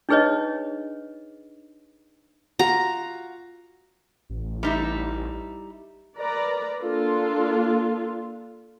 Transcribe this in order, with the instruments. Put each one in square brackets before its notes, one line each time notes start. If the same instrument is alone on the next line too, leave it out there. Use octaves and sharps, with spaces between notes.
[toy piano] D4 D#4 G#4 B4 C#5 D#5
[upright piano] F4 F#4 [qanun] A#5
[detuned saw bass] A1
[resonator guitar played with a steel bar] G3 D#4 E4
[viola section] A#4 B4 D5 A#5
A#3 D4 F4 A4